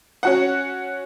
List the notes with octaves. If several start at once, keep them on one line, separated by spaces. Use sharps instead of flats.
C#4 F#4 F#5